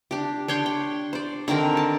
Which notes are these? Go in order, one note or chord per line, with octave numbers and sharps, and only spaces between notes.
D4 G4
D4 C#5 G5 C6
G5
C5 D5
D3 D#3 C4 A#4
A5